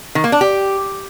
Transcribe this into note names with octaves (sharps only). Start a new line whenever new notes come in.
D#3
A#3
D4
G4